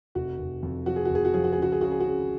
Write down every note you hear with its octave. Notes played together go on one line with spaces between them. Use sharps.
F1 F#4
F1
F2
F3 F#4
G#4
F#4
F1 G#4
F#4
F3 G#4
F#4
G#4
C#2 F#4
G#4
C#3 F#4
G#4
C#3 F#4